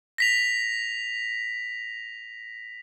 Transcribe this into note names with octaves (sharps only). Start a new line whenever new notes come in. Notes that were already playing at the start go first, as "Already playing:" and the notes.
A#6 B6 F7